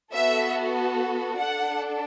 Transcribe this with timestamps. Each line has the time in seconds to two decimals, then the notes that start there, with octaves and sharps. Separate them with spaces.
0.12 B3 F#4 A4 E5
1.37 D4 A4 F#5